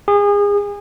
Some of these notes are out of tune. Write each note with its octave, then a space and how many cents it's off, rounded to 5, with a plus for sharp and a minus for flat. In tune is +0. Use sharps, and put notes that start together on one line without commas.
G#4 -30